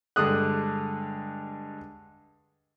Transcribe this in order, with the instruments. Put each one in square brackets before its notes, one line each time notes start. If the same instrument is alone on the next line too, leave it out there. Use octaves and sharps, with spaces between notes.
[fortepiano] G2 D3 G#3 D#6 F#6